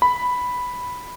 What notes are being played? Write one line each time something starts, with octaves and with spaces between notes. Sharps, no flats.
B5